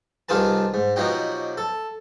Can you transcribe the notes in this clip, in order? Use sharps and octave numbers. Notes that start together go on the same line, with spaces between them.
C2 D#3 F4 G#4 B4 A5
G#2
B2 F3 F#3 D#4 G4
A4